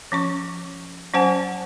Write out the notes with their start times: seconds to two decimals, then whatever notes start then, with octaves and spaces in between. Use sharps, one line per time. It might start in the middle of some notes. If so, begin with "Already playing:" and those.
0.12 F3 C#4 C#6
1.14 F#3 C#4 C5 F#5 G#5 A5